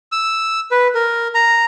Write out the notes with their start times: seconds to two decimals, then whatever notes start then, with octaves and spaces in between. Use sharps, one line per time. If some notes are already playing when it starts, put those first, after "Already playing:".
0.12 E6
0.71 B4
0.95 A#4
1.35 A#5